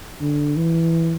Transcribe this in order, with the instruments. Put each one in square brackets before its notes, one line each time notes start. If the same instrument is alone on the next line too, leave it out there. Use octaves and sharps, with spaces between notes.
[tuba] D3
E3